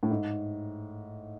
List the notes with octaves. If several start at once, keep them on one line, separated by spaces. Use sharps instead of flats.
A2
G#2